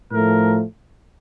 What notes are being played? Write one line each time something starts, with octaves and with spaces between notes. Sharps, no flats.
A2 F3 A3 A#4